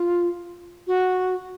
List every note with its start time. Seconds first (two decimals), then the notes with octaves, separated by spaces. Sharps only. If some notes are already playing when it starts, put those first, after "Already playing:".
Already playing: F4
0.87 F#4